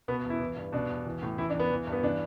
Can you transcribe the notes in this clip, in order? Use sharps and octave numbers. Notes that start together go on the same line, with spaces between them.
B2 B3
E2
E4
E3
G2
B2 D4
E2
E3
A2
E3 E4
D4
E2
B3
E3
G2
B3
E3 D4